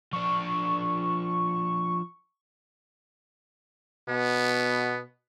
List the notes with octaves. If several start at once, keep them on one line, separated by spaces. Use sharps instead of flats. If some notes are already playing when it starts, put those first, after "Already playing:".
F3 D4 C#6
B2 B3